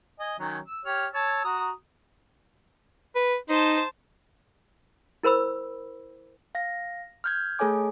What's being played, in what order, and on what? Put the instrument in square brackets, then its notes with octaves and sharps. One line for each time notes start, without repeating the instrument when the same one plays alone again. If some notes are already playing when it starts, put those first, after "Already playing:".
[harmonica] D#5 G#5
D#3 F#3 C#4
E6
G4 C#5 F6
C#5 A5 E6
F#4 A#5 D#6
[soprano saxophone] B4
[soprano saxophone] D#4 [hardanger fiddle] C5 A5
[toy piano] E4 A#4 C5 B5 E6
[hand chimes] F5 A#6
F6 G6 G#6
A3 G#4 A4 C#5 G#5 D6